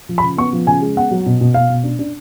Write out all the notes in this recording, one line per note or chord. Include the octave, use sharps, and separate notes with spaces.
F3
B5
C#3
B3 C#6
F3
C#3 G#5
G#3
B3 F#5
F#3
B2
B2
B2 F5
B2
D4
D4